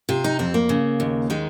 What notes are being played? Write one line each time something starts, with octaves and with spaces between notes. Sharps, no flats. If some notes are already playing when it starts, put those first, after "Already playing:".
C3 F4
D#4
F2 C4
A#3
C#3
D#2
D#3 G#3